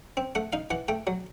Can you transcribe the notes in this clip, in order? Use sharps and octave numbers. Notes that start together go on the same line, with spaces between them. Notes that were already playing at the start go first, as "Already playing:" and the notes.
C4
A3 F#5
D#4 F5
E3 F#5
A3 G5
F#3